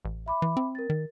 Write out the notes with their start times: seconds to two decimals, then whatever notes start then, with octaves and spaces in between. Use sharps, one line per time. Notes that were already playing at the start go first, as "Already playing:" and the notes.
0.05 A1
0.26 E5 B5 D6
0.42 E3
0.57 C4
0.75 A#4 A6
0.90 D#3